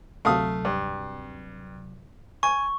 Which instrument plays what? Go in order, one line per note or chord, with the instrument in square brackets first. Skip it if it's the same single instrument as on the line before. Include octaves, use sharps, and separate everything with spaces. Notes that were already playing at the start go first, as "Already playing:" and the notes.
[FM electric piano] D2 C3 F#3 [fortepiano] A3 F5 D#6
[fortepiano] G2
[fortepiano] G#5 [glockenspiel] C#6